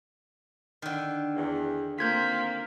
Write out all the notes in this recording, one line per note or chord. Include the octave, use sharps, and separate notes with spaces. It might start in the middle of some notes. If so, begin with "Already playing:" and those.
D3 D#3
E2
A#3 C4 F4 G6 G#6 B6